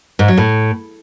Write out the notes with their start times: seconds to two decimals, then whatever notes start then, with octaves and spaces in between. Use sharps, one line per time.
0.19 G#2
0.28 F#3
0.37 A2